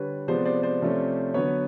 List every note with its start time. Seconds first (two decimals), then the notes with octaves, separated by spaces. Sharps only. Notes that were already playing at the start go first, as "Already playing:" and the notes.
Already playing: D3 G3 B4 C#5
0.27 C3 F3 G#3 B3 C5 D5
0.45 C5 D5
0.63 C5 D5
0.81 C3 F3 A3 C#4
1.34 D3 F#3 B3 B4 C#5